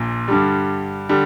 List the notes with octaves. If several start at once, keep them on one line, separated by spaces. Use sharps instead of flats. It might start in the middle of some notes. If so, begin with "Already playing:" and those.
Already playing: A#1 A#2
G2 D3 G3
D3 G3